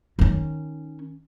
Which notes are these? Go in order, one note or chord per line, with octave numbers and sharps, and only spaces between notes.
D#3 C#4